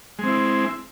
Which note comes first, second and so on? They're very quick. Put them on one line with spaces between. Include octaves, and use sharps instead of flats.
G#3 C4 E4